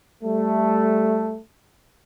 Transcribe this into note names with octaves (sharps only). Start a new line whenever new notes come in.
G3 A3